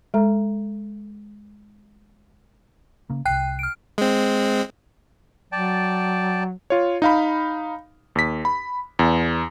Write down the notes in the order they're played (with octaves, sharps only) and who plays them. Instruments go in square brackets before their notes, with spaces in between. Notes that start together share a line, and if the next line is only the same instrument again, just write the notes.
[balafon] G#3 A4 A#5
[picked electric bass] C#3 A#3
[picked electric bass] D1 C2 [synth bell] G5 F#6 C7
[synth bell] F6 D7
[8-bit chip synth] G#3 C4
[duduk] F#3 [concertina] D5 G5 A5
[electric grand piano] F4 C#5
D#4 F5 B5
D#2 B6
B5
E2